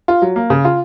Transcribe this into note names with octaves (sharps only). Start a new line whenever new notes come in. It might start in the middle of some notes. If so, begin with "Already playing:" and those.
F4
F#3
A#3
C#3
F4